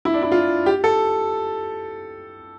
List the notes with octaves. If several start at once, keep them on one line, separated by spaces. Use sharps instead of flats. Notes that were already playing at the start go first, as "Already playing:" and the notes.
E4
D4
E4
F4
G4
A4